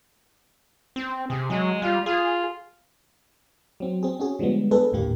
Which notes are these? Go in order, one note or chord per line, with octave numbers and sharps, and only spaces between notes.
C4
C3 G#4
F#3 G#3
G3 F4
F4 G#4
F#3 C4
C4 G#4
C#4 F#4 G#4
D3 F3 G3 G#3 B3
B3 D4 G#4 A4 B4
G#1 D#2 A2 D3 A#3 G4